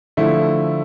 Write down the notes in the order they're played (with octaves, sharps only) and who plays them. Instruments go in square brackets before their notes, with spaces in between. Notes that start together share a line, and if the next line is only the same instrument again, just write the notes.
[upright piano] D3 F3 A3 E4